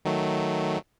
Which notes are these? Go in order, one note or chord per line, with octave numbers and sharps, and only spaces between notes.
D#3 F#3 A3